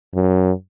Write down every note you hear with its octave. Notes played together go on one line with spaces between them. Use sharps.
F#2